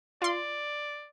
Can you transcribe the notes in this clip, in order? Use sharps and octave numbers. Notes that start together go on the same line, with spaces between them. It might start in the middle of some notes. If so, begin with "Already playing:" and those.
F4 D5 C6